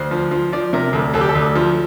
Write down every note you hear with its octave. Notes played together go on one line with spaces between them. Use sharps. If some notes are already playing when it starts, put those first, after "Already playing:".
Already playing: D2 C5
F3
F3
F3 D5
C3 A#4
D2 A4
D2 A4
G4
A4
D2
F3